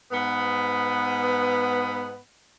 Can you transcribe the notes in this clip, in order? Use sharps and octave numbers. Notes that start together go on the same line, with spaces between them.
G#2 B3